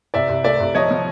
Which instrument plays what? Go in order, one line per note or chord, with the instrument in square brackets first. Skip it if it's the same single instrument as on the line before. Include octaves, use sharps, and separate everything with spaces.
[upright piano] C2 [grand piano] D5 E5
[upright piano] C2
[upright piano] A3 [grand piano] D5 E5
[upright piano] C2
[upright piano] F3 [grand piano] C#5 D#5
[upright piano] F3